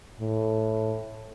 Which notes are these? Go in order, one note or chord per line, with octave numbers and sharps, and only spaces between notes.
A2